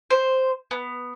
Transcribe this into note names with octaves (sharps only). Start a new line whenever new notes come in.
C5
B3